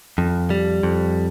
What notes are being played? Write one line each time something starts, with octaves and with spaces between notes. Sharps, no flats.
F2
G3
F2